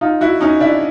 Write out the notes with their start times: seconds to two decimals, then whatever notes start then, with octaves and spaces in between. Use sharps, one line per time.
0.01 D#4 F4
0.21 E4 F#4
0.41 C#4 D#4
0.60 D4 E4